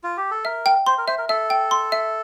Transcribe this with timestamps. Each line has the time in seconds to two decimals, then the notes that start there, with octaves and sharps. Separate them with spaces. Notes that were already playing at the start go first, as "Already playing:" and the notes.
0.03 F4
0.17 G4
0.31 A4
0.45 A#4 E5
0.66 G5
0.86 C5 C6
0.98 A#4
1.08 C5 E5
1.18 A#4
1.29 A4 E5
1.50 G5
1.71 C6
1.92 E5